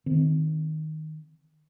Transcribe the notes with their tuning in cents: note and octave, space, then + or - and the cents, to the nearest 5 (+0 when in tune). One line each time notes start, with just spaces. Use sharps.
D#3 +0 C4 -20